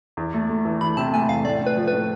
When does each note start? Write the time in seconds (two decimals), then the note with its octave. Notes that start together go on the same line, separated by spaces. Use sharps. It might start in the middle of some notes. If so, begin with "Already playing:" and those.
0.17 E2
0.34 A3
0.49 A3
0.65 E3
0.81 E3 B5
0.97 C3 A5
1.13 A3 G#5
1.29 E2 F5
1.45 A2 D5
1.62 A2 B4
1.77 F3
1.88 B4
1.93 A2